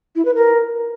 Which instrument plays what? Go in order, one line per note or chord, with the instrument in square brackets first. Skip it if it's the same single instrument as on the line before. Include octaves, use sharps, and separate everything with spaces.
[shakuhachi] E4
B4
A#4